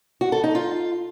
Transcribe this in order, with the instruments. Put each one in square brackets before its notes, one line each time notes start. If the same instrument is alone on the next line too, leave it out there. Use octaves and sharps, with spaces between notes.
[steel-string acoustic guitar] F#4
A4
D#4
F4